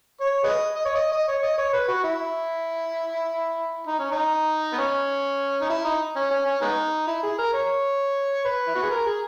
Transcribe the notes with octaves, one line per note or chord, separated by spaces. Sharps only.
C#5
G#4 B4 D#5
D#5
C#5
D#5
D#5
C#5
D#5
C#5
B4
F#4
E4
D#4
C#4
D#4
B3
C#4
D#4
E4
D#4
C#4
C#4
C#4
G#3 B3 D#4
E4
G#4
A#4
C#5
B4
E4
F#4
G#4
A#4
G#4